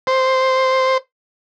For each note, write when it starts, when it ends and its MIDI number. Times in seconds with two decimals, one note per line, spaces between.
0.07 0.98 72